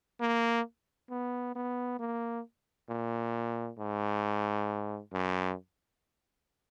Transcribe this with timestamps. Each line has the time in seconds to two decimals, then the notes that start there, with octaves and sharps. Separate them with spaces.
0.21 A#3
1.11 B3
1.55 B3
2.00 A#3
2.90 A#2
3.79 G#2
5.13 F#2